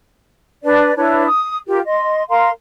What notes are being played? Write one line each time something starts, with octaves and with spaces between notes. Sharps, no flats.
D4 B4 D5
D4 E4 B4 C#5
D#6
F4 G4 A#4
D#5 C6
A#4 F5 A#5 C6